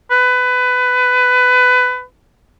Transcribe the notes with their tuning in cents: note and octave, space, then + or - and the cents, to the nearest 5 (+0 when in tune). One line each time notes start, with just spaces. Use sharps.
B4 +20